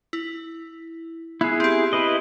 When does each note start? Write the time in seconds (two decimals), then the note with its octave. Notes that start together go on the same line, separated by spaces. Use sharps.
0.13 E4
1.41 B3 E4 G#4
1.60 C4 G4
1.93 E4 B4 D#5